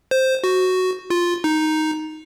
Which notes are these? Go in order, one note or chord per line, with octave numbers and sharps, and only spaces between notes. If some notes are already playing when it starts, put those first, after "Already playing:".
C5
F#4
F4
D#4